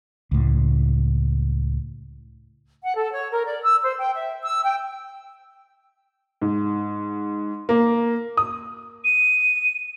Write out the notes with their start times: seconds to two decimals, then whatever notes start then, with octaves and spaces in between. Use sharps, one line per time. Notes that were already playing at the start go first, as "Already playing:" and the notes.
0.31 C#2 A2
2.82 F#5
2.97 A4
3.12 C#5
3.31 A#4
3.46 D5
3.63 E6
3.82 C5
3.98 G5
4.13 E5
4.43 E6
4.63 G5
6.42 G#2
7.69 A#3
8.37 D#6
9.04 D#7